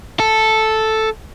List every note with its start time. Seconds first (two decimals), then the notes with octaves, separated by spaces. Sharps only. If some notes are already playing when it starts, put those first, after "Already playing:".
0.20 A4